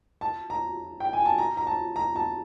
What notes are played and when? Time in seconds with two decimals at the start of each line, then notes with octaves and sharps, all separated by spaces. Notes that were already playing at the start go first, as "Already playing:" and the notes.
0.21 A5
0.50 A#5
1.00 G5
1.13 G#5
1.25 A5
1.38 A#5
1.57 A#5
1.67 A5
1.96 A#5
2.16 A5